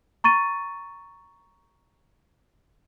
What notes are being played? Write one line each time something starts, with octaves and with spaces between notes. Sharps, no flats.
A#5 C#6 A6 D#7